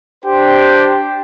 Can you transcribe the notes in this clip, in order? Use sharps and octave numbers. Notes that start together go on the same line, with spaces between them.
D4 G4 C5 G5